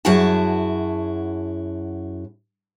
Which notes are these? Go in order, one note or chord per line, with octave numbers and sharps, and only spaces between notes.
F#2 E4 F#4 G#4 F#5 A5